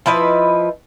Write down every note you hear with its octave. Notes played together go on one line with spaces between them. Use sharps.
F3 E4 B4 D#5